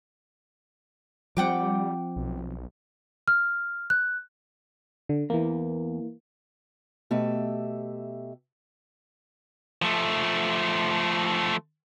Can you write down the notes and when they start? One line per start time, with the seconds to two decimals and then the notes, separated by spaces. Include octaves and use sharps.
1.37 F3 G3 C4 F#5 G5 D6
2.16 B1
3.28 F6
3.90 F#6
5.09 D3
5.30 E2 E3 A#3
7.11 B2 A3 G4 E5
9.82 F3 A3